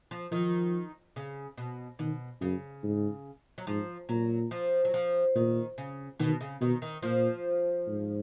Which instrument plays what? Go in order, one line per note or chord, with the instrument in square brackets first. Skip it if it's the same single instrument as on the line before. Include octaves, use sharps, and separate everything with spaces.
[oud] F3
[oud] D#3 [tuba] F3
[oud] C#3
B2
[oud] B2 [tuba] D#3
[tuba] F#2 [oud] C#3
[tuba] G#2
[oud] F#3
[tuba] G#2 [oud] F3
[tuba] A#2 [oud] F#3
[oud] F3
F#3
F3
[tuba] A#2 [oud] D#3
[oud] C#3
[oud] B2 [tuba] D#3
[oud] C#3
[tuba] B2 [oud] D#3
[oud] D#3
[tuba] A#2 [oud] F3
[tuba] G#2